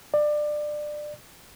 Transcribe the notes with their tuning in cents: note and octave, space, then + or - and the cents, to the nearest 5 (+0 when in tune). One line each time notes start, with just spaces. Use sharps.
D5 +25